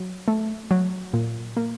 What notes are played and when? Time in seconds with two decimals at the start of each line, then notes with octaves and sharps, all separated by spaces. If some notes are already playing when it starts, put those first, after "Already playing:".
Already playing: F#3
0.28 A3
0.71 F#3
1.13 A#2
1.57 A#3